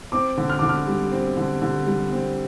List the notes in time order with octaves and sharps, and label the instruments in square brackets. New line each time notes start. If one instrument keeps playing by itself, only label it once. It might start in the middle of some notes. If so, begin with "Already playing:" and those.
[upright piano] C4 D6
D3
F6
D3 D6
F6
G3
C4
D3
D3
G3
C4